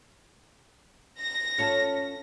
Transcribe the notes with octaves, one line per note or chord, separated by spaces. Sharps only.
A#6
C#4 F4 A4